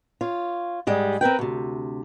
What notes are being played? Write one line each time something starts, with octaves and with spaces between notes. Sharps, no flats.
F4 C#5
G#2 G3 G#3
C4 A#4 B4 G5
D2 C3